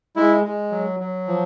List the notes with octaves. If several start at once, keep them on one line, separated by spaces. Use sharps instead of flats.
G#3 E4
G#3
F#3
F#3
F3